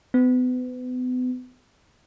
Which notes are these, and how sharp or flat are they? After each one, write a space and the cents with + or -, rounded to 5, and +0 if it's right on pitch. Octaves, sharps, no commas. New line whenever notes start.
B3 +35